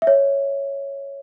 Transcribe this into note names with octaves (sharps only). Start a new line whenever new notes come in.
E5
C#5